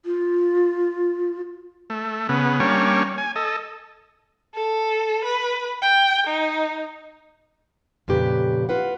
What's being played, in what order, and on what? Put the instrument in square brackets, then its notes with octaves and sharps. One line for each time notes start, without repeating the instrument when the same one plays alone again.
[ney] F4
[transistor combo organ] A3
C#3 B3
G3 A#3 C#4 D4 C#5
G#5
A4 D#5
[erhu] A4
B4
G5
D#4
[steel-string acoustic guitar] F2 A#2 C#3 G4 B4
F4 B4 F#5